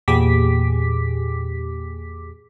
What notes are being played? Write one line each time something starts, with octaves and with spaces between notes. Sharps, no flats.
E2 A#2 G4 G#4 D6 B6